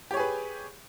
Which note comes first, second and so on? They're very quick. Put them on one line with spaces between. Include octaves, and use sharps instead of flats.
G4 C#5 G#4 B4